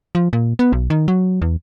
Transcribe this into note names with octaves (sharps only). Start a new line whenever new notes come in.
F3
A#2
B3
B1
D#3
F#3
E2